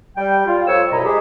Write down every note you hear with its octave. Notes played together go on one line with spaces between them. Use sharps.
G3 G5
F4
F2 C#5 E6
C2 F#2 B2 E4 D#5 A#5
G#3 G4 G#4